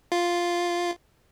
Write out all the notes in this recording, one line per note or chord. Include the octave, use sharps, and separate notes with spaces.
F4